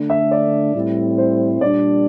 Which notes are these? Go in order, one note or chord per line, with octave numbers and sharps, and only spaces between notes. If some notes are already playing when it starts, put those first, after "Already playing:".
Already playing: D3 A3 D4
E5
D5
A2 G3 C4 E4
C5
A#2 G3 D4 D5